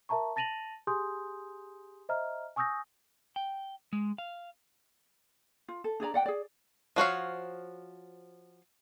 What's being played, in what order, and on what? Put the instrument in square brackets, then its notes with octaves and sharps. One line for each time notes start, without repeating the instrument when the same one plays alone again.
[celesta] A#4 E5 A5 A#5 C#6
A5 A6 A#6 D#7 F7 F#7
G4 G#4 G#5 C6 D#6 G6
C5 D#5 E5 A#5 F6
G#5 C#6 D#6 E6 G6 A#6
[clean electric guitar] G5
G#3
F5
[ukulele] F4
A4
D4 G#4 D5 A#5
D5 F#5 G5
G#4 D5
[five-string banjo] F3 F#4 C#5 F5